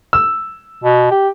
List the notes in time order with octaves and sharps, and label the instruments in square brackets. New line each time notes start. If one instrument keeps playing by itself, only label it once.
[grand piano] E6
[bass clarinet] B2
G4